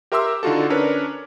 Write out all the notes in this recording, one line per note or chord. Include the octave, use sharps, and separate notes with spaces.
G4 A#4 E5 C6 D6 E6
D3 D#4 F4 F#4 A4
C#4 D4 A#4 B4 C#5